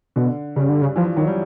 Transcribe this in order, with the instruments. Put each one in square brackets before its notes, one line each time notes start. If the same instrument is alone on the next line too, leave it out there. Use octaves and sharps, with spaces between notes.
[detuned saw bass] B2 [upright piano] D3
[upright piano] G2 G3 [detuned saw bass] C#3
[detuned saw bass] D3
C#3
[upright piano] E3 [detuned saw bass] F3
[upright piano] F3
[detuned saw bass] D#3 [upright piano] F#3
[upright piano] G3